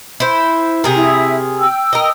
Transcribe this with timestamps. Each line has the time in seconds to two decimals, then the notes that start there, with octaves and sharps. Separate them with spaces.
0.20 E4 C5
0.84 C3 G#4 A#4
0.96 E4
1.58 G5 E6
1.93 A#4 D#5